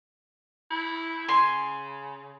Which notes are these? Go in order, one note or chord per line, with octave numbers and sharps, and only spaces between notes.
E4
C#3 G#5 C6